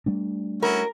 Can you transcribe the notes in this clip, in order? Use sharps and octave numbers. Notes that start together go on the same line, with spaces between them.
G3 A3 D4
C#4 E4 F#4 A#4